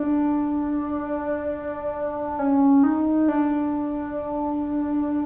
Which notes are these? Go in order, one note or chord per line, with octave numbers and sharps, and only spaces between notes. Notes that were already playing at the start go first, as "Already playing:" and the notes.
Already playing: D4
C#4
D#4
D4